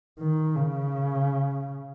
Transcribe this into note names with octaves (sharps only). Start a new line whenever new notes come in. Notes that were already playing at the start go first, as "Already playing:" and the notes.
D#3
C#3